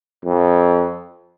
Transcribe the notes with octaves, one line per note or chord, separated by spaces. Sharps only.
F2